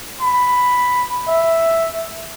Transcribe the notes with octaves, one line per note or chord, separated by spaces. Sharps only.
B5
E5